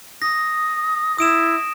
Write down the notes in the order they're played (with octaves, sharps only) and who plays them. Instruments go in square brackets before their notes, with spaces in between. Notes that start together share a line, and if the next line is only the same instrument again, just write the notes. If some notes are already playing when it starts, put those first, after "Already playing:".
[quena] D#6 [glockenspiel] A#6
[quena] E4 [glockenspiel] D#6 D7 E7